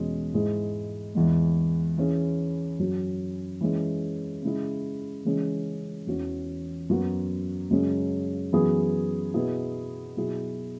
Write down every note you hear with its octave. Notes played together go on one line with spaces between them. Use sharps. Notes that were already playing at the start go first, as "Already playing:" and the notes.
Already playing: E2 B2 G#3 C#4
G#2 G#3 E4 G#4
E2 E3 G#3
E3 C#4 G#4
F#2 F#3 C#4
E3 G#3 C#4 G#4
C#3 G#3 E4 G#4
C#3 E3 G#3 C#4 G#4
E2 E3 C#4 F#4
F#2 F#3 B3 F#4
F#2 C#3 G#3 C#4 G#4
F#2 E3 B3 G#4
B2 B3 E4 G#4
B2 F#3 E4 G#4